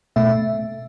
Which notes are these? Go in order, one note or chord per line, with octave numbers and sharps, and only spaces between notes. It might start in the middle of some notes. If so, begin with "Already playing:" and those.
B2 A3 E5